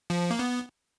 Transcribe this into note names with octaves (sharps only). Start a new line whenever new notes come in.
F3
A#3
B3